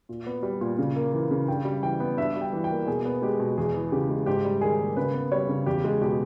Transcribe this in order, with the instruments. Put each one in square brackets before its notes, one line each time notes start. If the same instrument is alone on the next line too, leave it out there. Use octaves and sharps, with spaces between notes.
[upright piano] A#2
B3
G3
A#2
C#3
A#3
E3
C#3
G2 G5
G3
E3 G5
B3
G2 E5
G3
G5
E3
G5
A#3
B2 G#4
B3
G#3 G4
B2
E2 G#4
E3
C#3 G4
G#3
G#2 G4
G3
D#3 G#4
A#3
C#3 B4
B3
G3 C#5
C#3
E2 G4
G#3
B2 G4